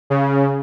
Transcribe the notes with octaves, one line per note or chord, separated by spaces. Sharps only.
C#3